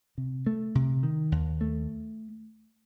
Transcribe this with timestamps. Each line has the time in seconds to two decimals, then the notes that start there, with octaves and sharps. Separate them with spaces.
0.18 C3
0.46 A3
0.75 C3
1.03 D#3
1.32 D#2
1.61 A3